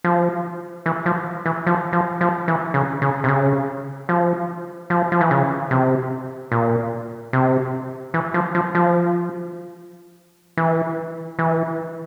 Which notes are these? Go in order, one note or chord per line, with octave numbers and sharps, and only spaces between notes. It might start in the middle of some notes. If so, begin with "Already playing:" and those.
F3
E3
F3
E3
F3
F3
F3
E3
C#3
C#3
C3
C#3
F3
F3
F3
E3
C#3
C3
A#2
C3
E3
F3
F3
F3
E3
E3